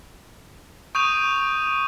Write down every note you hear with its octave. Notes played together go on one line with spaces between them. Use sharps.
C#6 D#6 G6 D#7 F7